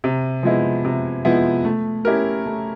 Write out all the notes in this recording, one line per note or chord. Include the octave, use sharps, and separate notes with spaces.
C3
F3 G#3 B3 E4
C3
F3 G#3 B3 E4
A3
C#4 E4 G4 A#4
A3